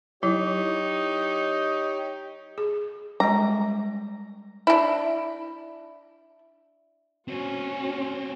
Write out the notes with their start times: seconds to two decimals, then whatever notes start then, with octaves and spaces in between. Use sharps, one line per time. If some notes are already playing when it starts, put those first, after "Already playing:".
0.23 F#3 D#4 E4 G4 C#5
2.58 G#4
3.20 G3 G#3 D#5 A#5
4.67 D4 E4
7.28 C4 C#4 F#4 C#5